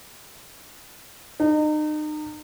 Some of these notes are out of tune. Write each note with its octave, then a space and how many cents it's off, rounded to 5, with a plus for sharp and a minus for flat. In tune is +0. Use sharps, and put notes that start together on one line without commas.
D#4 -35